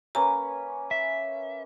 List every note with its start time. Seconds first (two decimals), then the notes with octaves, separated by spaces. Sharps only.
0.15 A#3 C#4 B4 A#5
0.91 E5